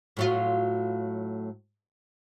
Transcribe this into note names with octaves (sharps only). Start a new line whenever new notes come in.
A2 F#3 F4